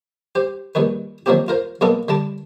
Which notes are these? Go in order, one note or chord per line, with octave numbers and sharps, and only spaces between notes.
G4 C5
A#1 G2 D#3 B4
D#3 F3 F#3 A#3 C4 G4
F4 A#4 C5
B1 G#3 A#3 B3 A4
D3 G3 A5 D6